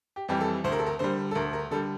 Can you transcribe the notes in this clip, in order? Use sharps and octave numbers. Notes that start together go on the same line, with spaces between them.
G4
F2 E3 G3 G4
A4
D2 C5
A#4
A4
A#4
D3 G3 C5
A4
D2 A#4
A#4
D3 G3 A4